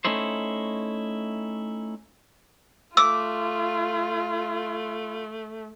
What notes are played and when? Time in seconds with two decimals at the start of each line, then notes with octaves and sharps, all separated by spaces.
0.05 A3 C#4 D#4 E4 C5
2.97 A3 F4 D6 E6